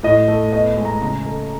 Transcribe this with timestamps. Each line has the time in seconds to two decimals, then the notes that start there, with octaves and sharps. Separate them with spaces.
0.03 A2 D#5
0.28 A3
0.53 B3 D#5
0.77 G#3
0.85 A#5
1.01 C#3 A#5
1.26 A3